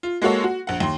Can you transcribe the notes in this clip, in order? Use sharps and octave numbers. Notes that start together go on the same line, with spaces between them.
F4
G#3 A#3 F#4 A4 C#5
F#4
A#1 F#5
D#2 C6